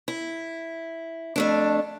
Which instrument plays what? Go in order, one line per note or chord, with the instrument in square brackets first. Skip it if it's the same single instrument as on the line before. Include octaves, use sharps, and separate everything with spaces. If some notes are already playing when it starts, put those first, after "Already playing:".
[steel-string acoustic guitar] E4
F2 A3 D4